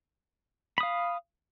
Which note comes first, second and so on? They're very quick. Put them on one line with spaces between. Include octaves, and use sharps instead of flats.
B5 D#6 F5